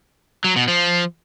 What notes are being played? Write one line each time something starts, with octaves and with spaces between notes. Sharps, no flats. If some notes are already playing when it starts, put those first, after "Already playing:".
F#3
B2
F3